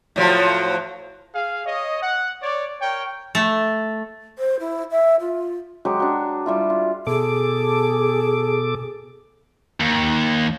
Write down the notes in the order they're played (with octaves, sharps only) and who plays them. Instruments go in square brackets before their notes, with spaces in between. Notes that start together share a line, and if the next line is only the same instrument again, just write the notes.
[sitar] A2 F3 F#3
[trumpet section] G#4 F5
C#5 D#5
F#5
C#5 D5
A#4 C#5 G5
[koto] A3
[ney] C5
E4
E5
F4
[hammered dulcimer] F#3 G#3 G4
F#3 D4
G3 E4 F4
F4
[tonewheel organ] B2 A4 D6 [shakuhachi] G#4
[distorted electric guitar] D#2